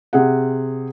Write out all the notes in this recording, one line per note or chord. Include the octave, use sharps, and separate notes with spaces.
C3 G#4 F#5